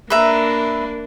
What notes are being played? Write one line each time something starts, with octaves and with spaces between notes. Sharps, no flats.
A#3 D4 B4 E5 A#5